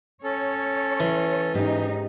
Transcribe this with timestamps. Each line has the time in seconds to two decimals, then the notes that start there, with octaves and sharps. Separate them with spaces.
0.24 C#4 A4 C#5
1.00 E3
1.54 G#2 C#4 D#4 G4